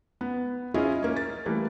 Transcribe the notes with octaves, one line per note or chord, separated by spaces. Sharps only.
B3
C#4 E4 F4 G#4 D#5
A#3 C#4
A6
E3 G3 A3 A#3